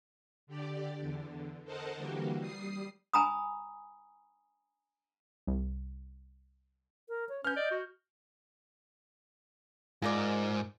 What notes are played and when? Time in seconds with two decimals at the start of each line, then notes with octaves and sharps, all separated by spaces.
0.47 D3 G4 D5
1.00 E2 D3
1.65 A4 A#4 C5 D#5 F#5 A5
1.96 D3 E3 G3 A#3 F#4 G4
2.39 G3 D#6 C7
3.14 G#5 A#5 B5 D#6
5.47 C2
7.09 A#4
7.29 C#5
7.45 C#4 B4 F6 G6
7.56 D5 D#5
7.71 F#4
10.02 G#2 F4 A#4 D5